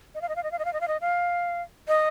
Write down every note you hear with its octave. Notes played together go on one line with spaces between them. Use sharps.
D#5
F5
D#5
F5
D#5
F5
D#5
F5
D#5
F5
D#5
F5
D#5